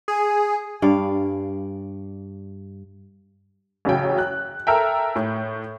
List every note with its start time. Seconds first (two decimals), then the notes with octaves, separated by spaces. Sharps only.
0.08 G#4
0.82 G2 D5 F5
3.85 A1 C#3 F#3 G5
4.18 F#6
4.67 A4 A#4 E5 G5
5.16 A2